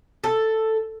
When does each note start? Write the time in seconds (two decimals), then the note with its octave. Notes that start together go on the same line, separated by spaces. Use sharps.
0.24 A4